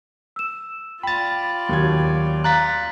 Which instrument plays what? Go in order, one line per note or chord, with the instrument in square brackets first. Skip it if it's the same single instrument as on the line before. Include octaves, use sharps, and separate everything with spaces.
[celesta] E6 E7
[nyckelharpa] F4 D5 [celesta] G5 [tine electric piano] B5 A6
[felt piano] D#2 F#3 G#6
[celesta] F5 A#5 [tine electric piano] F#6 A6 B6